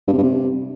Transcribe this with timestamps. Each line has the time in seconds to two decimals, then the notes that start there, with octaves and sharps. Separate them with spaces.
0.07 G2
0.12 C3
0.18 G2
0.23 C3